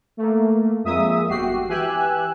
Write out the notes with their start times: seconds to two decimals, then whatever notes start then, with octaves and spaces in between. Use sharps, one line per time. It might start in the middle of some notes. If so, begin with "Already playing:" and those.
0.17 A3 A#3
0.84 F2 G#3 A#3 E5 D#6
1.29 G1 F#4 G4 C7
1.68 E3 G4 G#5 E6 F#6